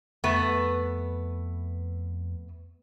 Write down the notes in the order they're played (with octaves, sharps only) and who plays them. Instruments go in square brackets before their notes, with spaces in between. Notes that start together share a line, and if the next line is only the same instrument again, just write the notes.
[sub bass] F2 [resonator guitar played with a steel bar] A3 B3 B4